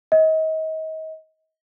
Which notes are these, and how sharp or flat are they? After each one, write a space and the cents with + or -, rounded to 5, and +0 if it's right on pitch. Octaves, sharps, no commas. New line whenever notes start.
D#5 +35